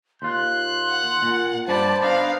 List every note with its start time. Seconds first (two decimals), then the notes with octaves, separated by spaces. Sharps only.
0.22 D#2 F4 C6 F#6
0.89 F#5
1.22 A#2
1.68 G2 D4 C5 D5 A5 B5
2.02 B3 D4 D#4 F5 A#5